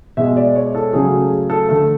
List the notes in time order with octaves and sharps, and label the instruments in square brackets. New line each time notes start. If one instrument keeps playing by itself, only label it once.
[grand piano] B2 G#3 E5
D5
C#5
A4
C#3 F#3 A3 G#4
A4
D3 A3 A4